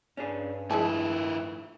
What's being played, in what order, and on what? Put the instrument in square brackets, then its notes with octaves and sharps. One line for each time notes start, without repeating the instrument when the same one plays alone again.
[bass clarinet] G2 [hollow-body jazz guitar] C#4 D4 G#4
[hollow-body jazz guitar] A2 F3 [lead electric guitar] D#3 E4 [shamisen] G#3 G#5 A5